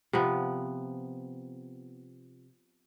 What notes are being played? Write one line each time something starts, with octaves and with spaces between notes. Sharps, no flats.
C3 F3 B3